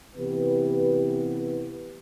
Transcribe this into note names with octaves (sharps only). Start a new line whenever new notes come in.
C3 E3 B3 G4 B4